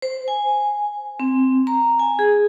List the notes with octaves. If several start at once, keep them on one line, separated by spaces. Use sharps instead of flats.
C5
G#5
C4
A#5
G#5
G#4